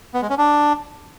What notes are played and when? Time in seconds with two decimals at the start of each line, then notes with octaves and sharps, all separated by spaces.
0.14 B3
0.22 G#3
0.30 C#4
0.38 D4